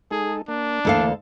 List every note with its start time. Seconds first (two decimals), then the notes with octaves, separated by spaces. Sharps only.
0.11 G#3 D#4 G#4 A4
0.48 A#3 D4
0.85 D2 D3 E3 A#3 A4 F5